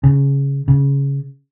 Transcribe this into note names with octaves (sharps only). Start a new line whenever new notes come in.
C#3
C#3